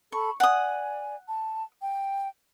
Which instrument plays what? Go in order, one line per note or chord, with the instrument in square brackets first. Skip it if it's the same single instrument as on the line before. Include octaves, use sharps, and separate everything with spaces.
[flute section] A4 A5 B5 [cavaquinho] C#6
[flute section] D5 G#5 [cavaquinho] F#5 D#6
[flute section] A5
G5